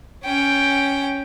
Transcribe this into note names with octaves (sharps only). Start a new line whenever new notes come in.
C#4 G5